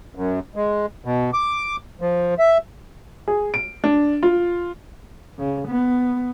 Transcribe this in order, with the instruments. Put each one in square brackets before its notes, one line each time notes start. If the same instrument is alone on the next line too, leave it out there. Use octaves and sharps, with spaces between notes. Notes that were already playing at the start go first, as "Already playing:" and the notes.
[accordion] F#2
G#3
B2
D6
F3
E5
[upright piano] G#4
D7
D4
F4
[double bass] C#3
B3